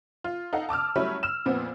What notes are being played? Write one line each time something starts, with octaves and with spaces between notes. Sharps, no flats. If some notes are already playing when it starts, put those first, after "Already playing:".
F4
D#4 A4 F5 F#5
A5 D6 E6 F6
F#3 G3 A3 C#4 E4 B5
E6 F6 E7
F2 A#2 F3 B3 C4